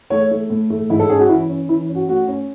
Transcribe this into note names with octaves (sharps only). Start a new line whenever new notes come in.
A3 C#5
A3
A2
A3
G#2 E4
A4
C#4 G#4
F#4
E3 E4
C#4
E3 E4
C#4
F#4
A3 F#4
C#4